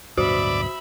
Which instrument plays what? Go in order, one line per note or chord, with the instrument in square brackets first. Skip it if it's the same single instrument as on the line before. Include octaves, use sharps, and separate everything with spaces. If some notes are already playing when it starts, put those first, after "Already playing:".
[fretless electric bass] D1 G2 B2 [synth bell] F#4 [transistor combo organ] D5 [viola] E5 B5